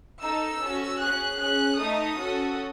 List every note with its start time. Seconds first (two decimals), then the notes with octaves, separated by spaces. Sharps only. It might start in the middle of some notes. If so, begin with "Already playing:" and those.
0.23 D#4 A4 E6
0.62 C#4 F#4 A4
1.00 C#4 G#4 F#6
1.40 C#4 G#4 F#6
1.78 A3 D#4 A4 D#6
2.18 C#4 F#4 A4